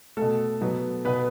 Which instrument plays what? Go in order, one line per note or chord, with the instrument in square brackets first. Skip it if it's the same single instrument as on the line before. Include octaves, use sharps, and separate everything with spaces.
[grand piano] B2 A3 A4
B2 F#3 B3
B2 B3 B4